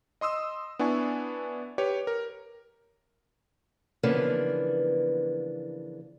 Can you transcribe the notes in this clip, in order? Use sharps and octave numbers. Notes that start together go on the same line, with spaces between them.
D#5 C6 D#6 E6
B3 D4 E4 G#5 C#6
G4 B4 C#5
A#4
C#3 E3 F3 A#3 B3 D4